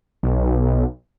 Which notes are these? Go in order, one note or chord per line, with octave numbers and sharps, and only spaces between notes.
B1